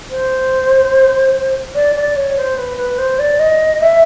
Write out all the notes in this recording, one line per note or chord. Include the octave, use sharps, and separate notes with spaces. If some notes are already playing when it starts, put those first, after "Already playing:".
C5
D5
D5
C#5
C5
B4
B4
C5
D5
D#5
E5